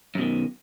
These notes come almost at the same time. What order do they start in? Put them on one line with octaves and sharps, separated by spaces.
F#2 B2 D#3